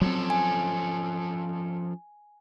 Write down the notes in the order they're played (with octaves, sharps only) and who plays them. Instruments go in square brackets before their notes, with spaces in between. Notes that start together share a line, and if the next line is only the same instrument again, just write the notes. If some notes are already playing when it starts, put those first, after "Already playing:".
[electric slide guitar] F3 C#4 A4 [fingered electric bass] F#3 C4
[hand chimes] G#5